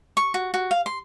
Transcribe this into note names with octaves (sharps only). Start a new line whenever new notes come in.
C#6
F#4
F#4
F5
C6